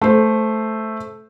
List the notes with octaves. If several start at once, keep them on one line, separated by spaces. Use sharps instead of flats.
A3 C5